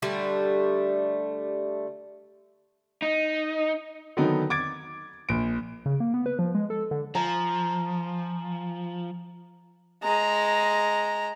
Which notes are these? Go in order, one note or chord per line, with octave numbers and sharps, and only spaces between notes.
D3 G3 A3
D#4
D3 D#3 F#3 B3 D#4
D6 G#6 A6 D7
A#1 D7
C#3
A#3
B3
B4
F3
G#3
A4
D3
F3 G#5 A#5
G#3 A#5